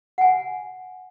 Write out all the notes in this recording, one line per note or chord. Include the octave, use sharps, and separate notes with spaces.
F#5 G#5